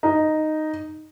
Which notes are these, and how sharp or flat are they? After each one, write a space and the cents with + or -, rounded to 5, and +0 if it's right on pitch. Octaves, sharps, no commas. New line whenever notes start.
D#4 -5